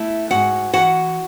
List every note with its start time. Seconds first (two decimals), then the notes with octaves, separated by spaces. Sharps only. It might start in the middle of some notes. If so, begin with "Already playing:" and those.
Already playing: A3 E4 E5
0.30 G#2 F#4 F#5
0.73 E3 F#4 F#5